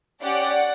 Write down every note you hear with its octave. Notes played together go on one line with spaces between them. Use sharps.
C#4 G4 D5 F#5